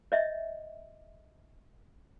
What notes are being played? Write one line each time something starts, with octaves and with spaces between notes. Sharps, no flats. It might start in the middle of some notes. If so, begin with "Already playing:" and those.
C#5 D#5 E5